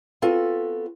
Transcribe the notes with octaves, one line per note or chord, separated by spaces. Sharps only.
B3 C4 F4 F#4 A4